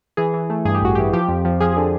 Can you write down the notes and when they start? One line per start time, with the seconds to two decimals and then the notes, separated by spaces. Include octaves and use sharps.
0.17 E3 G#4
0.34 E3
0.50 A3
0.65 G2 G#4
0.75 G4
0.81 A1 F#4
0.95 E3 G4
1.13 F3 G4
1.29 F2
1.45 F3
1.60 F3 G#4
1.77 D3